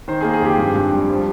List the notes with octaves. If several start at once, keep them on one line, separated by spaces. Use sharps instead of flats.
D#3 C5
A#3 G#4
G#4
F2 G4
G2
G2
G3
F3